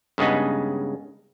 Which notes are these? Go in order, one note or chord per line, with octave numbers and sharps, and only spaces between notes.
G2 C#3 G#3 B3 D#4